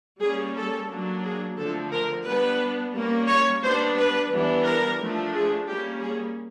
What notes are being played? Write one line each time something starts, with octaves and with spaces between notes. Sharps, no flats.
G3 A#3 C#4 G#4
A4
F#3 A#3 D4
G#4
D3 F3 A3 C4 A4
A#4
G3 B3 D4 B4
G3 A#3 C#4
C#5
G3 B3 D4 C5
B4
E3 G3 B3 D4
A#4
F3 A3 D4
G#4
G3 A#3 C#4 G4
G#4